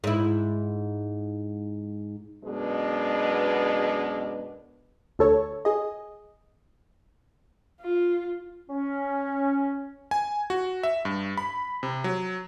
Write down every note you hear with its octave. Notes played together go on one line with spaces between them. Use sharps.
G#2 E4
F#2 B2 G#3 B3 D4
D2 A4 C#5
G#4 D#5
F4
C#4
G#5
F#4
E5
G2
B5
C3
F#3